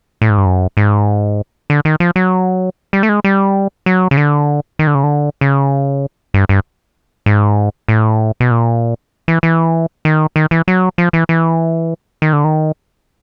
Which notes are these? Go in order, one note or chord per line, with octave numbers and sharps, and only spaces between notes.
A2
G#2
G2
F#2
G#2
D3
D#3
F3
F#3
G3
A3
G#3
G3
F#3
C#3
D3
D#3
D3
C#3
D3
C#3
G2
G2
G#2
A2
B2
A#2
E3
E3
D#3
D#3
E3
F#3
F3
E3
E3
D#3
D3
D#3